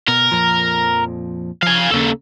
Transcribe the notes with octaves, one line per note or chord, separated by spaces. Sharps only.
B2 A#4
F2 A#2 F3
F3 F5 G#5
D#2 C#3 A#3 C#4 A4